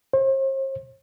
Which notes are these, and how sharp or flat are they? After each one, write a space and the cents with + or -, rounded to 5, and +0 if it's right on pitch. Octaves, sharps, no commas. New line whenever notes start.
C5 +45